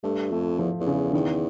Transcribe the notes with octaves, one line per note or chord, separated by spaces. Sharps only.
G2 A3
F2 A3
E2 F3
E2
C#3
E2 D#3